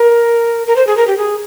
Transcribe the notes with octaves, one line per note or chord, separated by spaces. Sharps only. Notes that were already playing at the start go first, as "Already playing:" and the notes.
Already playing: A#4
A#4
C5
G#4
A#4
G4
G#4